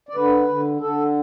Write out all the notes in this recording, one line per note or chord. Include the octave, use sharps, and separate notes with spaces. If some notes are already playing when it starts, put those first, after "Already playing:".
D5
D3 B4
D3
D3 A4